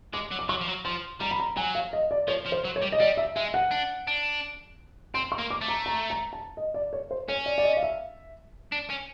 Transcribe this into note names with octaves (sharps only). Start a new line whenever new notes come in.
G#3 D6
F#3
D6
F#3 C#6
F3
F#3
F3 C6
G3 A#5
B5
A#5
F#3 G#5
F5
D#5
D5
F3 C#5
F3
C5
F#3
C#5
G3
D#5
G3 D5
E5
G#3 E5
F#5
D4
D4
C4 C6
C#6
A#3
D6
A3
A#5
A#5
A#5
A5
D#5
D5
C#5
C5
C#4 C#5
D5
D5
D#5
F5
E5
D4
C#4